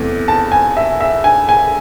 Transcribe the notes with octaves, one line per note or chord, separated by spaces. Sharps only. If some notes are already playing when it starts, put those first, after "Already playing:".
Already playing: E2 C3 E3 A3
A5
G#5
E5
E5
G#5
G#5